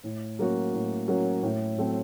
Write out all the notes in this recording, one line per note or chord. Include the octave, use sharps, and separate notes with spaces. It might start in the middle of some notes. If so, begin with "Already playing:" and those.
A2
F#3 A#3 C#4 F#4
A2
F#3 A#3 C#4 F#4
A2
F#3 A3 C4